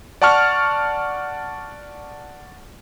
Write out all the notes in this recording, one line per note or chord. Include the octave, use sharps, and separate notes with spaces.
D5 F#5 A5 C#6 F6